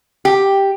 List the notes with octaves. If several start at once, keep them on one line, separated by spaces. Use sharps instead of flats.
G4